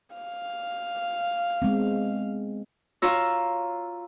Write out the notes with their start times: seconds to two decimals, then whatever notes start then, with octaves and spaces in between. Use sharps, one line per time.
0.15 F5
1.62 G#3 B3 C4
3.02 F4 C#5 A#5 E6